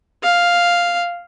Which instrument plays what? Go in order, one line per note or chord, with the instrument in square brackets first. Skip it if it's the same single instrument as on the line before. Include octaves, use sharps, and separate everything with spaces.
[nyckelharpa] F5